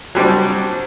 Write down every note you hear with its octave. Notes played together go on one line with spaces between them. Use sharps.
F#3 G3 C4 D4